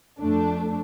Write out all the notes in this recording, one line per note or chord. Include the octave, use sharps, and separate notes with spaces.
F2 A3 D4